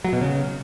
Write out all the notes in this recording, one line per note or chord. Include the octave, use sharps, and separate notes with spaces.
F#3
B2
C#3